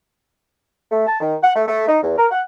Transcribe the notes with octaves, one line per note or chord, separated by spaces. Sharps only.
A3
A5
D#3
F#5
A3
A3
D#4
E2
A#4
F#5